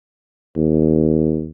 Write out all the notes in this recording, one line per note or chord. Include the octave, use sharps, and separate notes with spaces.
D#2